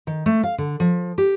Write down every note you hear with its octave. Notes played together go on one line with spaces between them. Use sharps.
D#3
A3
F5
D3
F3
G4